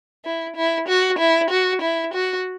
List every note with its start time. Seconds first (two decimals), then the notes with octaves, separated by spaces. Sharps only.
0.25 E4
0.56 E4
0.88 F#4
1.19 E4
1.51 F#4
1.82 E4
2.14 F#4